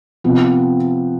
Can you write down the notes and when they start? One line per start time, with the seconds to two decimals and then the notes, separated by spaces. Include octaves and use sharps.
0.24 C3 F3 B3